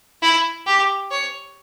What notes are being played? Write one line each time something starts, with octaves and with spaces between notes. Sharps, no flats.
E4
G4
C#5